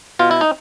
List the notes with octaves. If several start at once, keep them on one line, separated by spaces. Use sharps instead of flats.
B2 F4
E4
D#4